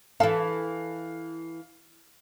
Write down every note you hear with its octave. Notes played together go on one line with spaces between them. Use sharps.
E3 A4 F5